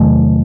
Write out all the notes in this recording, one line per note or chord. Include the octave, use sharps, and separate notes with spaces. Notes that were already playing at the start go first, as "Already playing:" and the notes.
Already playing: E2 C3 D#3 F#3 A3